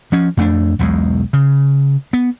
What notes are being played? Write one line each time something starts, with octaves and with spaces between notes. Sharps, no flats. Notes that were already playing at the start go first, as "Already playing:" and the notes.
F3 C#4
F2 A3 D4
E1 B1 E2 G#3
C#3
B3